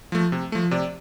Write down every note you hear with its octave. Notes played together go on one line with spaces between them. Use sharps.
F3 A3
C3
F3 A3
C3 D5